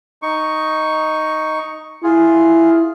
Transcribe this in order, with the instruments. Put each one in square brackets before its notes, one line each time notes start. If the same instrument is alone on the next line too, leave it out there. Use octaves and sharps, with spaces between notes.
[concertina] D#4 C#6
[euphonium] E4 [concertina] F4 G#4